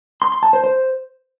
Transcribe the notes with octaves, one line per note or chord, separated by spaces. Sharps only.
C6
C6
A5
C5
C5